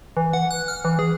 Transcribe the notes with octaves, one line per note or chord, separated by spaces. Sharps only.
E3
F#5
F#6
F6
E3
G#4